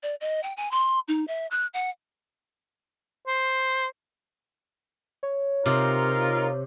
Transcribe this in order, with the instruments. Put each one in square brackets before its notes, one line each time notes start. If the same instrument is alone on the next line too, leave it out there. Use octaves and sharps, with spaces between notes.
[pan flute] D5
D#5
G5
G#5
C6
D#4
E5
F#6
F#5
[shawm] C5
[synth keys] C#5
[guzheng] C3 [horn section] D#4 F4 A#4